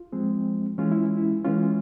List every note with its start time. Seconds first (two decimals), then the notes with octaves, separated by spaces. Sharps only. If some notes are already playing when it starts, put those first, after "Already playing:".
Already playing: F4
0.12 F3 G#3 C4
0.78 E3 G#3 C#4 F4
0.91 E4
1.17 E4
1.45 E3 G#3 C#4 F4